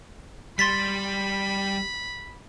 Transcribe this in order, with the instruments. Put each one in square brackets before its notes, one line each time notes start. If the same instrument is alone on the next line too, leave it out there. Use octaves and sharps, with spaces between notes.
[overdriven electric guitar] G3 [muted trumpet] B5 [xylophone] C6 A6 B6